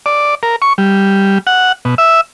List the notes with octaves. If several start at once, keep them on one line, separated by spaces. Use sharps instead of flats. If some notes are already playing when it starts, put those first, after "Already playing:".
D5
A#4
C#6
G3
F#5
B2
E5